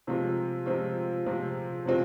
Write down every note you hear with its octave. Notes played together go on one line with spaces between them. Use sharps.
C3 F3 G#3 C4 F4
C3 F3 G#3 C4 F4
C3 F3 G#3 C4 F4
C3 F3 G#3 C4 F4